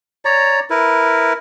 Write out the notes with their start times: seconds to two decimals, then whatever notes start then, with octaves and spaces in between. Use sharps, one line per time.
0.25 C#5 D5 A#5
0.70 E4 A#4 B4